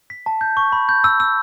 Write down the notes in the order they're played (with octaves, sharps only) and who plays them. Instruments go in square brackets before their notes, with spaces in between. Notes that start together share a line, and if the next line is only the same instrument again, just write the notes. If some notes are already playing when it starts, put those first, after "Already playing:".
[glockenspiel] B6
A5
G6
C#6
B5
G6
E6
E6